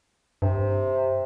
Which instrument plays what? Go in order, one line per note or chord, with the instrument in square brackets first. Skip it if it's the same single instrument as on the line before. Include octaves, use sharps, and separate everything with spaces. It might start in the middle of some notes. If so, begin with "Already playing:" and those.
[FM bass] G2 [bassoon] C3